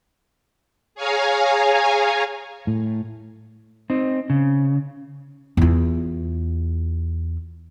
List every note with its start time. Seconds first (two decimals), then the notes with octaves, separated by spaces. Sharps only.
0.95 G#4 C#5 F5 G#5 A#5
2.67 A2
3.90 C4 D#4
4.30 C#3
5.57 E2 F4